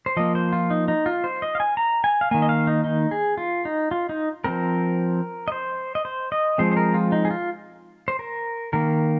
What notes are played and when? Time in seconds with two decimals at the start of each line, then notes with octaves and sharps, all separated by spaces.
0.06 C5
0.17 F3 A#3 D#5
0.35 C5
0.53 F4
0.70 D#4
0.88 D#4
1.06 F4
1.24 C5
1.42 D#5
1.55 F5
1.60 G#5
1.77 A#5
2.04 G#5
2.21 F5
2.31 D#3 A#3 G#5
2.42 D#5
2.49 F5
2.67 D#4
2.84 D#4
3.11 G#4
3.38 F4
3.65 D#4
3.91 F4
4.09 D#4
4.44 F3 C4 A#4
5.48 D#5
5.52 C5
5.95 D#5
6.05 C5
6.32 D#5
6.58 F3 G#3 C4 C5
6.72 C5
6.77 A#4
6.94 F4
7.12 D#4
7.25 G#4
7.31 F4
8.08 C5
8.19 A#4
8.73 D#3 A#3 A#4